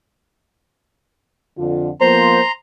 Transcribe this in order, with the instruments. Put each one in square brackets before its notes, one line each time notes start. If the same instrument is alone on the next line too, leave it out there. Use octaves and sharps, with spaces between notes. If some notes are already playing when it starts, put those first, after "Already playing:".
[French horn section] F2 D3 F4
[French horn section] F3 A#3 B3 [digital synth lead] C5 [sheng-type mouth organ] A#5 C6